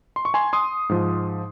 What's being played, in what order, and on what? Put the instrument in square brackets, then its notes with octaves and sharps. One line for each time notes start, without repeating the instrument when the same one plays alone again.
[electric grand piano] C6
C#6
G#5 C6
C6 D#6
G#2 F3